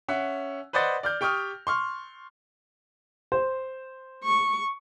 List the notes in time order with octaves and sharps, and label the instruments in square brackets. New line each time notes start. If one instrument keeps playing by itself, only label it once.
[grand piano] C#4 E5 F#5
B4 C5 D5 D#5 F#5 A6
D5 F6 G6
G4 G5 C#6 D#6 F6
C6 C#6 F6
C5
[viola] C#6